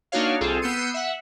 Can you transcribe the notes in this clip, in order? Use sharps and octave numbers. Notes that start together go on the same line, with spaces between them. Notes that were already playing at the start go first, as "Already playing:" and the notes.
A#3 D4 D#4 F#4 C#5 F5
C2 C4 F4 G#4 A4
B3 E6 G6 C7 C#7 D#7
E5 F#5